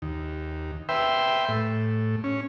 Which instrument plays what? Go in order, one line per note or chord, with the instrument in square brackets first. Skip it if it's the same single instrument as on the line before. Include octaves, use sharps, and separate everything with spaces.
[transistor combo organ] D#2
B4 E5 G5 C6
A2
C#4